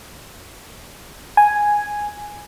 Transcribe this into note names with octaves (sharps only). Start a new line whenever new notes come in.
G#5